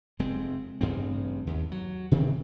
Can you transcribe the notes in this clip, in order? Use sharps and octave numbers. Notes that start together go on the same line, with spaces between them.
F1 G#3 C4
A1 G2 C#3 C4
D#2
F#3
C3 D#3 E3 C4